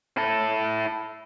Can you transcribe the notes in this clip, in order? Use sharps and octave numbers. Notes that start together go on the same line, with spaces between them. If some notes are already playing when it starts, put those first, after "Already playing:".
E4 A4